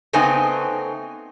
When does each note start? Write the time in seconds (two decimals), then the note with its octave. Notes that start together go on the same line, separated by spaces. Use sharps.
0.13 C#3 A3 B3 C4 D#4 G#5